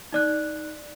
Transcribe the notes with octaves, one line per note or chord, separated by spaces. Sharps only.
D#4 D5 F#6